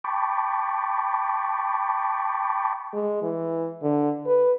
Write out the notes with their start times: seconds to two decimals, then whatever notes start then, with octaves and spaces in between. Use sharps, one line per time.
0.04 G5 A5 B5 C#6 D6
2.93 G#3
3.22 E3
3.83 D3
4.26 B4